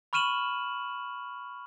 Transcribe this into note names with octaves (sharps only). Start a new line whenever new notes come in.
B5 C#6 F6 D#7 E7 F#7